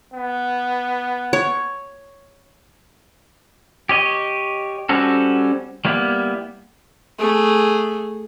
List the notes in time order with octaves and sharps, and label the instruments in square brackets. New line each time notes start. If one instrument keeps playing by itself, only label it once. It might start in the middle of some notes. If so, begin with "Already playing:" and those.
[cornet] B3
[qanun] C#5
[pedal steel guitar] G4 C#5 D#5
G3 C4 C#4 F#4 A4
G3 A#3 B3 E4
[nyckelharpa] A3 G#4